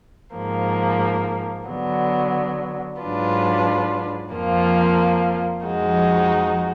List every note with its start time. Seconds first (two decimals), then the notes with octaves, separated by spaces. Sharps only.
0.35 G#2 F3 A#3
1.67 D3 F#3 B3
3.00 G#2 F#3 D4 F4 B4
4.32 F2 F3 A#3 F4
5.65 F2 F3 G#3 D#4 F#4